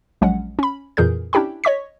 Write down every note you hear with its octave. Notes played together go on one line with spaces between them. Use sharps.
A#1 F#3 G#3 C#4 F#5
C#4 B5
F2 A#2 E3 G#4 A#4 G6
C#4 D4 E4 G4 G5 B5
C#5 D#5 C#6 B6